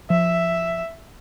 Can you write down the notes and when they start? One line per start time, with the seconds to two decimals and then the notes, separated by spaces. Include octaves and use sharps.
0.10 F3 E5